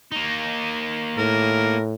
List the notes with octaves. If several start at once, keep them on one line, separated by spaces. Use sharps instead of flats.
A#3 D#4
A2 A#4